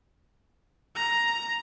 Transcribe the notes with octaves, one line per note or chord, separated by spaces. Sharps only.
A#5